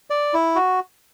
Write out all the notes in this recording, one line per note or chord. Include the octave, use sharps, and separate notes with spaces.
D5
E4
F#4